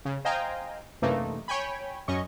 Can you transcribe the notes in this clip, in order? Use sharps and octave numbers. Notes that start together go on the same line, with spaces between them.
C#3
C5 D#5 F5 G5 G#5 A#5
F#2 C3 E3 A3 A#3 D#4
C#5 G5 G#5 B5
F#2 C#4 D#5 C#6